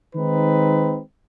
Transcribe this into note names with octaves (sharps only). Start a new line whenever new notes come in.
D#3 G#3 C4 D#4 B4